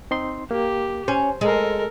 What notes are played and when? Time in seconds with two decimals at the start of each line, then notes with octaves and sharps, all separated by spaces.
0.11 C4 D#4 C6
0.51 A#3 G4
1.08 C#4 C5
1.41 G#3 A4 A#4